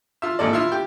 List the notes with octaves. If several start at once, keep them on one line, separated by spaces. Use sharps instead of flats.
F4 E5
G#1 A#2 A4 D5
E4 F4 E5
G4